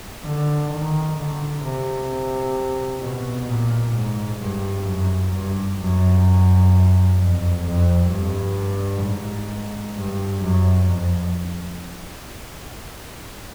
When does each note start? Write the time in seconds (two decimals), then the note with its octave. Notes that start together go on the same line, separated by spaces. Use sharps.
0.24 D3
0.70 D#3
1.16 D3
1.62 C3
3.01 B2
3.47 A#2
3.93 G#2
4.40 G2
4.86 F#2
5.33 G2
5.79 F#2
7.17 F2
7.64 F2
8.09 G2
9.02 G#2
9.94 G2
10.41 F#2
10.87 F2